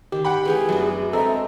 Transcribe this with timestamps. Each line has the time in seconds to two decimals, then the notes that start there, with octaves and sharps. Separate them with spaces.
0.12 D#3 G4 C5
0.25 F#5 G5 B5
0.45 E3 A3 C#4 G#4
0.69 F#2 F#3 B3 D4
1.13 G#3 C4 D4 A4 D#5 E5 A#5